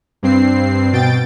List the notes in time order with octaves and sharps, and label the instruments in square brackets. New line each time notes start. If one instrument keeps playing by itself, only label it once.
[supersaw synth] G2 C4 C7
B2 G5 A6 D7